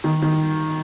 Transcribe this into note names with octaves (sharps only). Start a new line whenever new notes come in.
D#3
D#3